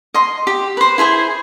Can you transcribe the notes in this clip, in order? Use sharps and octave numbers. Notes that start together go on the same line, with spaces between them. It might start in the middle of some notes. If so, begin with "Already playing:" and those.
D#5 C6
G4
B4 C5
E4 G#4 C5 G#5